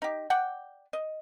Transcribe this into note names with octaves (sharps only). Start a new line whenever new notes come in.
D#4 G4
D5 F#5 G5
D#5